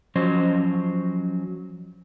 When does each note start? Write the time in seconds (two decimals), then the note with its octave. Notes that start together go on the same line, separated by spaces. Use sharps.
0.15 F3 F#3 C#4 C5 D#5